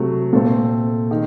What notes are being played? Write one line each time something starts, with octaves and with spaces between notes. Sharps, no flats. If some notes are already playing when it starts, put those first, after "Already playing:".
Already playing: C3 F#3 A3
A#2 A3 C4 A4
D#3